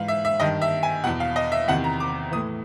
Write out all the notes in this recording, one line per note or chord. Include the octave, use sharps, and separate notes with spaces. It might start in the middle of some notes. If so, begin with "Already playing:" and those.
Already playing: G#2 E3 F5
E5
E5
G2 D#3 D#5
E5
G#5
E2 B2 F#5
F5
D#5
E5
E2 C3 D#3 F#5
A#5
D6
A2 E3 D#6